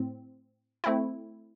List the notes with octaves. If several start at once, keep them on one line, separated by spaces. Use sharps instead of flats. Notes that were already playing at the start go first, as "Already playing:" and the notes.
Already playing: A2 C4
A3 C4 E4